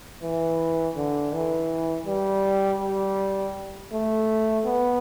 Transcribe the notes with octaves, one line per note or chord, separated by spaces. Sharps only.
E3
D3
E3
G3
G3
A3
B3